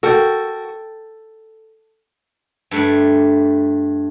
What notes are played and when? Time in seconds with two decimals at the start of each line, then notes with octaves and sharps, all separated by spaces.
0.03 F#4 A4 A#4 F#5 G5
2.71 G2 A3